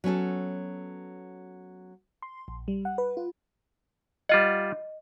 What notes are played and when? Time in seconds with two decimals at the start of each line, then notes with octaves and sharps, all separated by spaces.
0.04 F#3 B3 C#4 A4
2.22 C6
2.48 A#1
2.68 G3
2.85 F#5
2.98 B4
3.17 F4
4.29 G3 F4 D#5 F#5